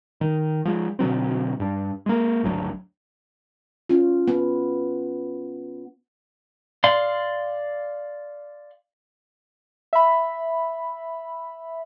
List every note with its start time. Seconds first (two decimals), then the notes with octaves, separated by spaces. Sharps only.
0.21 D#3
0.65 F3 G#3
0.99 B2 D3 F#3 C4
1.60 G2 D4
2.06 G#3 A#3
2.43 G#1 D2 F#3 D4
3.89 C#4 F4
4.28 B3
6.84 D5 F5 C6
9.93 E5 B5